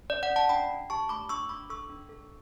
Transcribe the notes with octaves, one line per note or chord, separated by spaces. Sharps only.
C#4 D5
D5 F#5
C#4
F#5 A5
D4 G5 B5
D4
G4 A5 C#6
A3 B5 D6
D4 C#6 E6
D4 B5 D6
A4 C#6 E6
D4
A4